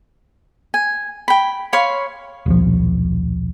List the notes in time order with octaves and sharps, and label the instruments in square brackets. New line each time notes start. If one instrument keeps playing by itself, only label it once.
[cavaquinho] G#5
G5 B5
C#5 F5 B5 C6
[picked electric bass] D#1 B1 F3